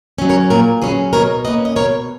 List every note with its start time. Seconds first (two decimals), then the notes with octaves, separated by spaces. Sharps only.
0.18 F#3 C#4
0.29 A#4 C#5
0.50 A#2 A#4 C#5
0.82 F#3 C#4 G#4 B4
1.13 B2 A#4 C#5
1.45 A#3 C#4 B4 D#5
1.65 D#5
1.76 B2 A#4 C#5